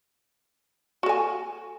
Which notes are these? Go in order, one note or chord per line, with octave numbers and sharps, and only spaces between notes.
F#4 A4 G#5